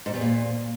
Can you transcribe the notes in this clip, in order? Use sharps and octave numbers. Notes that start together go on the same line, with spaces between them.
G#2
E2
A#2